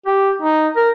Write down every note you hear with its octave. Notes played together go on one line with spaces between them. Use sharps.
G4
D#4
A#4